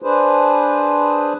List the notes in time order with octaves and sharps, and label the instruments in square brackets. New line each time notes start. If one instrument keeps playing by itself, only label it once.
[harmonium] D4 G#4 B4 C5